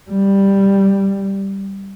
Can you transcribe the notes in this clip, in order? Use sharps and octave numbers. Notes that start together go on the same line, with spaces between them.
G3